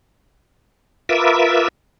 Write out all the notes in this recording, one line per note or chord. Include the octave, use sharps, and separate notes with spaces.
F4 A#4 B4 E5 D6 E6